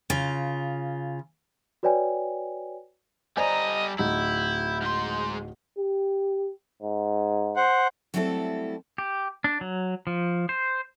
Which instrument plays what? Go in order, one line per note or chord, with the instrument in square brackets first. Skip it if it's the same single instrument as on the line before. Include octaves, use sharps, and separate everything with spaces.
[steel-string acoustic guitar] C#3 F4
[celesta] F#4 B4 C#5 D5 G5 G#5
[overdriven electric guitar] G3 A#5 [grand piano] C5 D5 G#5 [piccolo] D#5
[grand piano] D1 D#4 [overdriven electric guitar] E4 [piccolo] G6
[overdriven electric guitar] G#2 C6
[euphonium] G4
G#2
[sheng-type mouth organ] C5 F#5
[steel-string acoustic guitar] F#3 G3 A3 C4 E4 A4
[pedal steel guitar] G4
D4
F#3
F3
C5